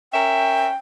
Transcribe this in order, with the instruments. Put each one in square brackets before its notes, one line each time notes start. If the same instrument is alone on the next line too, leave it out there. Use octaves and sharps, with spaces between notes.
[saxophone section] C#4 A#4 E5 [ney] G5